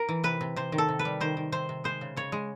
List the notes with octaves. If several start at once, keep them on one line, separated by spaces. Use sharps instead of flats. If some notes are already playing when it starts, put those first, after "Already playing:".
Already playing: A#4
E3
C3 B4
C3
C3 C5
D#3
A4
C3
B4
G3
D#3 C5
D#3
C3 C5
C3
G#3 C5
C#3
C#3 C#5
G#3